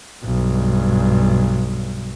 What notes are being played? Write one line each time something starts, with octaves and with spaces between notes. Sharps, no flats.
B1 G2